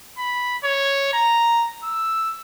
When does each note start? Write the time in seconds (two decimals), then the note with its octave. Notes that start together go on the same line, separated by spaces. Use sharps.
0.17 B5
0.64 C#5
1.13 A#5
1.83 E6